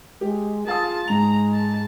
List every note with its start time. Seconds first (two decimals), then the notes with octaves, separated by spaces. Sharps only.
0.21 G#3 G4
0.67 F4 G#4 F5 A5 D#6
1.08 G#2 G#3 A#5 F7
1.54 A5